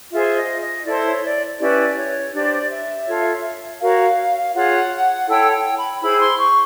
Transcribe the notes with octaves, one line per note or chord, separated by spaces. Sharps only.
F4 G#4 C5 E5
D#5
D#5
E4 A4 C5 D5
C#5
D5
C#4 E4 G4 B4 D5
C#5
D4 G4 C5 D5
E5
F4 A4 C#5
F#4 A#4 C#5 F5
F4 G#4 C#5 F#5
E4 A4 C#5 G5
G5
B5
E4 G#4 C5 B5
C6
C#6